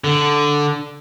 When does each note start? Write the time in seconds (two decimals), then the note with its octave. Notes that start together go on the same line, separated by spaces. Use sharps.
0.04 D3